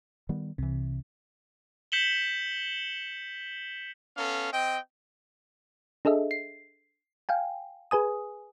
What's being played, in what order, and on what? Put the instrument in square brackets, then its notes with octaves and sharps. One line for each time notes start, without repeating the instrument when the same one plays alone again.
[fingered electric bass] D#3 G3 B3
[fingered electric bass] C2 E3 [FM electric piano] C3
[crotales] G6 B6 C#7 E7 F#7 G7
[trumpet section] B3 C#4 A4 F5
C4 D#5 G5
[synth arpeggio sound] D4 G#4 A4 D#5 E5
C7
F5 G5 G#5
G#4 B4 G#5 D#6